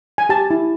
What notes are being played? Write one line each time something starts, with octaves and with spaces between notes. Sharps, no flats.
G#5
G4 A5
E4